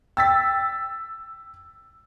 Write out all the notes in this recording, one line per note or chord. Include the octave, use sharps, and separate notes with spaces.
G5 E6 A6 B6